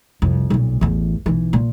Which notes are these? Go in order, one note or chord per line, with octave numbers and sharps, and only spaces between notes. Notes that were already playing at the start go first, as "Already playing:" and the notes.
C2 F2
B1 A#2
A1 E2
B1 E3
A#2